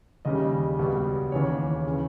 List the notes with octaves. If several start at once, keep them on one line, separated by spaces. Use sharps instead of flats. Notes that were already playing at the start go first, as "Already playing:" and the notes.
D#2 C#3 G3 D#5
C#2 B2 G3
D#2 C#3 E3 C#5
C#3 E3